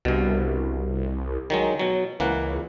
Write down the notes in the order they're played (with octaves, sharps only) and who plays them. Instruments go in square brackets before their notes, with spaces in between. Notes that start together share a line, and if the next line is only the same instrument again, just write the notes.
[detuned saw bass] C2 [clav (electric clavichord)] G2 B2
[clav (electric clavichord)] D#3 F#3 G#3
B2 F#3
[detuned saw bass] C#2 [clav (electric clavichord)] E3 A#3 F#5